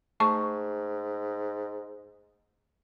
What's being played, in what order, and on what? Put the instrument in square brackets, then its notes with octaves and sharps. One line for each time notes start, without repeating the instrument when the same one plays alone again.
[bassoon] G#2 [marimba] A3 A5 C#6